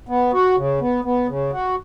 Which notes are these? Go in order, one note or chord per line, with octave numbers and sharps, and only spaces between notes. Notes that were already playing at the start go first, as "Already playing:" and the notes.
B3
F#4
C#3
B3
B3
C#3
F#4